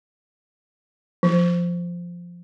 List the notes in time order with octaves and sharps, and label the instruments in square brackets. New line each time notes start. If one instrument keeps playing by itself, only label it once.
[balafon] F3